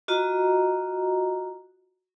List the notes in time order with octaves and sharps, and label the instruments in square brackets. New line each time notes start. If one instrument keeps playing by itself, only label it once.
[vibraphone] F4 F#4 D#5 A#5